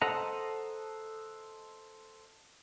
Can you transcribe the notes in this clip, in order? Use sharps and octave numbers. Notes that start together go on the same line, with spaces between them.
A4 C5 D#5 F#5 A#5